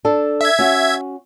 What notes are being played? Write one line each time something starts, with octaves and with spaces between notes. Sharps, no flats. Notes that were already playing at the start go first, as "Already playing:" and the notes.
D4 A4
E5 G#6
C#4 F#4